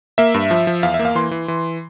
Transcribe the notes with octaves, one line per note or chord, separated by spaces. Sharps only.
A#3 E5
G2
F3
F3
E2 F5
E5
A#3
F5
E3 C6
E3
E3